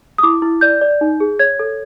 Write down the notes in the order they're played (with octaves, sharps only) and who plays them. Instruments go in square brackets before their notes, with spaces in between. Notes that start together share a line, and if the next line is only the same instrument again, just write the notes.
[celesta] D#6
E4 D6
E4
D5 G6
D5
D#4
G#4
C#5 G#6
A4